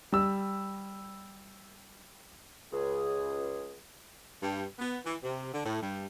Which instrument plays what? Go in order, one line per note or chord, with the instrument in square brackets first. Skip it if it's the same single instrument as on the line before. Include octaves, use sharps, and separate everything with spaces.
[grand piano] G3 E6
[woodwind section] C#2 G#4
[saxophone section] G2
B3
E3
C3
D3
A2
G2